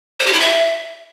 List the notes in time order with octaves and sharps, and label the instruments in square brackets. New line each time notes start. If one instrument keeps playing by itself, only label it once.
[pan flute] C5
G4
E4
E5